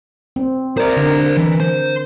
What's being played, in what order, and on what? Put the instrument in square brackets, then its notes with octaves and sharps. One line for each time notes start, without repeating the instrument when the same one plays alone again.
[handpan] C4
[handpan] A#4 [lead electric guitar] C5 D5
[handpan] D3
[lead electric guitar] E3
C5